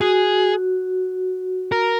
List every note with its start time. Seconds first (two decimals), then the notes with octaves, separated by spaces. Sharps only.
0.01 F#4 G#4
1.72 A#4